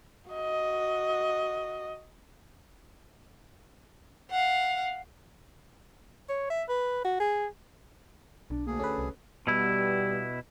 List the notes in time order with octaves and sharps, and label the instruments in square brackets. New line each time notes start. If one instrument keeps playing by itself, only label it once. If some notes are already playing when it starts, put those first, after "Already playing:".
[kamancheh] F#4 D#5
[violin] F5 F#5
[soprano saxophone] C#5
E5
B4
F#4
G#4
[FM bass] B1 [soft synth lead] D4
[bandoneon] D2 G#4 [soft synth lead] A#3
[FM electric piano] C#4 B4 [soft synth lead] A4
[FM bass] C2
[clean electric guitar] B2 E4 [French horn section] G3 B3